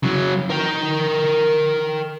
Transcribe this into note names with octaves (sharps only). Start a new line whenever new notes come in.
C#3 F#3
A#4 G5